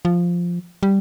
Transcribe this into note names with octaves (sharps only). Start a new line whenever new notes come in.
F3
G3